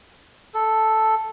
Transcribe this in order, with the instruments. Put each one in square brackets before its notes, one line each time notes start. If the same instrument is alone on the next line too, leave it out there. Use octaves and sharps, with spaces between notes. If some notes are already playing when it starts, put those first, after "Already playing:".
[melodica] A4